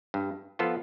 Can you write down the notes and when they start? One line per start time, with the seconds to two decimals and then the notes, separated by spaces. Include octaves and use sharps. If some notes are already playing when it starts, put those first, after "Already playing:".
0.14 G2
0.59 F3 B3 F4 A4